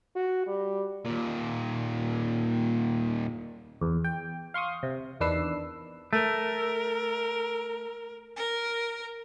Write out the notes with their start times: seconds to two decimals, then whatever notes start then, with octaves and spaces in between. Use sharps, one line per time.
0.16 F#4
0.47 G3
1.05 D#2 A#2
3.81 E2
4.04 G5
4.54 F5 C6 C#6 D#6
4.83 C3
5.20 E2 D#3 D4 B4 E6 C7
6.13 A3 A#4
8.36 A#4